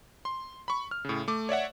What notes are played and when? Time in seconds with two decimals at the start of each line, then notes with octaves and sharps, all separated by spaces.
0.25 C6
0.68 B5 C#6
0.91 F6
1.05 A2 C#3
1.28 A3 D6
1.49 C#5 D5 E5 F#5